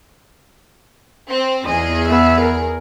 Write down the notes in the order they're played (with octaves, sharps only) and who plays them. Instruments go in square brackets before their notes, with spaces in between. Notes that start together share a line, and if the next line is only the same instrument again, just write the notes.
[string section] C4
[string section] E2 G#4 [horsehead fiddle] D#5
[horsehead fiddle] B3 E5
A#4